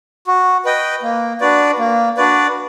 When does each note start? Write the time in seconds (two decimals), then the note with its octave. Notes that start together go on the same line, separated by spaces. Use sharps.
0.27 F#4
0.65 B4 D#5 G5
1.03 A#3
1.41 D4 F#4 B4 D5
1.79 A#3
2.17 D4 F#4 B4 D5